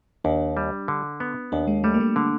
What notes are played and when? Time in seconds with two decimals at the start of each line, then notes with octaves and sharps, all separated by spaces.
0.24 D#2 D4
0.57 G3
0.88 D3
1.20 B3
1.52 D#2 D4
1.67 G#3
1.84 G3 A3
1.94 A#3
2.00 A3
2.16 D3 A#3